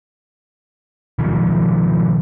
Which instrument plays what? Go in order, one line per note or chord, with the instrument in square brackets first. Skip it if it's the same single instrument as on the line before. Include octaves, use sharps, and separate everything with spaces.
[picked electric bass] B2 D#3 F3